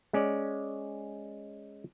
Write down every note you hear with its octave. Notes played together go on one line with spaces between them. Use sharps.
G#3 C#4 D5